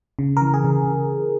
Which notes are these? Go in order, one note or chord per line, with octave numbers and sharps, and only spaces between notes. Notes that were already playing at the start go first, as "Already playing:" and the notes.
C#3
E3 A#4
G#4
C#3